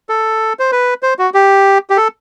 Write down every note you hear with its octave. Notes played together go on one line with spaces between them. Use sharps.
A4
C5
B4
C5
F#4
G4
G4
A4